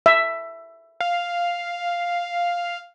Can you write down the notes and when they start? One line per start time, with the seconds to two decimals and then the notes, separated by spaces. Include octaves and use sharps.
0.06 E5
1.00 F5